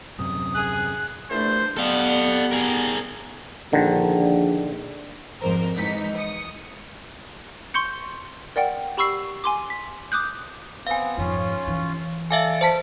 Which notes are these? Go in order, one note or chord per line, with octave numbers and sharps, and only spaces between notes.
D#1 F#2 C3 D#6
G#4 F#6
E2 A#2 A3 D4 C5
G3 B3 A4 D5 F5 F#5
G#4 A#4
A#1 D3 D#3
G#1 F2 A#4 C5
G#2 E3 D#4 B6 C#7
D#6 C#7
C6 C#6 G6 C#7
A#4 D5 F#5 G5
G4 B5 C#6 E6 C7
G#5 C6 D6
B6
D6 D#6 F#6 G6
B3 C4 F5 G#5
F2 G#2 C#4 F4
E3
A4 D5 E5 F5 G#5
C5 A5 B6